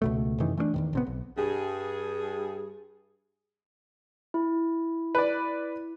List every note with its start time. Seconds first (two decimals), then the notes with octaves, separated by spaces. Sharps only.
0.02 C#2 B2 A3
0.40 F#2 C3 D#3 E3
0.57 E3 A3 A#3 D4
0.74 E2 A2 D#3
0.93 A#1 C3 B3
1.07 B1
1.38 G2 G#4
4.34 E4
5.15 B4 D5